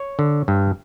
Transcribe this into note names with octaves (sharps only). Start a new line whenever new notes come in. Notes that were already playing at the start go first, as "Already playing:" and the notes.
Already playing: C#5
D3
G2